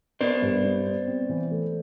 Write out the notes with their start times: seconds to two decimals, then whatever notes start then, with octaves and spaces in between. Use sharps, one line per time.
0.21 B3 C5 D5
0.42 G2
0.64 B3
0.86 B3
1.07 C4
1.29 E3
1.51 A3